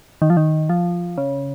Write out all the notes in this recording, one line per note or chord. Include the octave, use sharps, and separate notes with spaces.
D#3
F3
D#3
F3
C#3